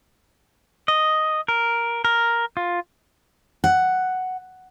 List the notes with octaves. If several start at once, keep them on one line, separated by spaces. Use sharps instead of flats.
D#5
A#4
A#4
F4
F#5